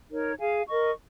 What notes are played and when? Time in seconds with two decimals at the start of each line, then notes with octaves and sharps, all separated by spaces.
0.10 D#4 A#4 C#5
0.38 G#4 F5 G#5
0.67 A#4 D#5 C#6